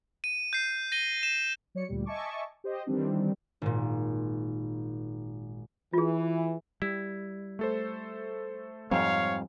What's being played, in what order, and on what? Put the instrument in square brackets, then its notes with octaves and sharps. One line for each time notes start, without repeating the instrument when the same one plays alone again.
[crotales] D#7
G6 C7
A#6 D#7 G7
E7
[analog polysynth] F#3 C#5 D5 C#7
D2 A#2 G3
D#5 E5 G#5 A5 C#6 D6
G4 C5 D#5
D#3 E3 G3 C4 D4
[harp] G#1 A#2
[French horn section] E3 [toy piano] F4 G#4
[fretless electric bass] G3 [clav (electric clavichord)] E4
[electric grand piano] A3 A4 C5
[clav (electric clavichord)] F2 G#2 [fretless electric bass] F3 G3 C4 [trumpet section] C#5 F5